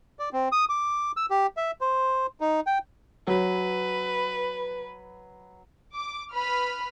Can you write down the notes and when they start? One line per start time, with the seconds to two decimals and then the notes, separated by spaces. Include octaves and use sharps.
0.19 D5
0.33 C4
0.52 D#6
0.69 D6
1.17 E6
1.30 G4
1.57 E5
1.81 C5
2.40 D#4
2.67 G5
3.27 F#3 B4
5.93 D6
6.33 B4 B5 F6